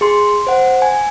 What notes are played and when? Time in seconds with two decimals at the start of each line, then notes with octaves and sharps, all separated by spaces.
0.01 G#4 C6
0.47 C5 F#5
0.82 G#5